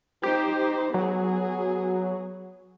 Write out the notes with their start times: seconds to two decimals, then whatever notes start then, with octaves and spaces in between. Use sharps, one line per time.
0.23 D#4 G4 C5
0.94 F#3 B3 G#4